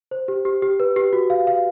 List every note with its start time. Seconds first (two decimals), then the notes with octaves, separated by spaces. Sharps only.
0.11 C5
0.28 G4
0.45 G4
0.62 G4
0.80 B4
0.96 G4
1.13 F#4
1.30 F5
1.47 F5